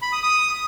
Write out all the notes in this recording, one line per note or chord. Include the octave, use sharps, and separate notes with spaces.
B5
D#6
D#6